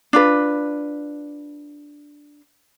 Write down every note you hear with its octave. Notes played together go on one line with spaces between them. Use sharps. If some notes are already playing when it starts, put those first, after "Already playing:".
D4 F4 B4